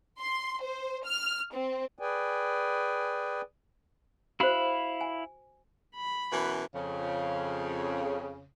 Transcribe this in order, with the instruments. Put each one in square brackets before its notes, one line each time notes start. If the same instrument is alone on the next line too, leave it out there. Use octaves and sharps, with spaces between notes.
[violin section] C6
C5
F6
C4
[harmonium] G#4 B4 D5 G5 G#5
[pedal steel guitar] E4 F5 B5 [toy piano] F#4 C5
[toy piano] G#5
[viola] B5
[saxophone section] F#2 B2 E3
F2 C#3